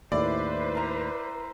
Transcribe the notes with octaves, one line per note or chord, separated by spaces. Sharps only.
D#2 A2 E4 B4 C5 D5
A#4 A#5